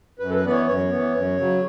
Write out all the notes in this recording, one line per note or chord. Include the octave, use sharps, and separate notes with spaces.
F#2 B4
A4
B4
E3 B3 D5
C#5
F#2 C#5
E3 B3
F#2
C#3 F#3